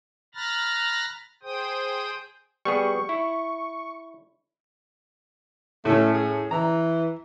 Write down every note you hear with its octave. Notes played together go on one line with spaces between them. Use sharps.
A#5 B5 F6 F#6 A6 A#6
G#4 C5 G5 D#6
G3 B3 G#4 C#6
E4
A2 A3 C#4
G#4
E3 A#5